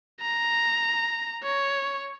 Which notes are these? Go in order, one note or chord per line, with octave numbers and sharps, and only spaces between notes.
A#5
C#5